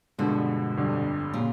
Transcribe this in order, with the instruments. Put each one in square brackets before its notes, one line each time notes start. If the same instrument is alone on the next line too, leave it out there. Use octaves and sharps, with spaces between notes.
[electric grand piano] G2 D3 F3 G#3 [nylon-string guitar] B2
[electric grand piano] G1 F2 D3 G3
[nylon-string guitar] A#2 [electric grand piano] C#3 F#3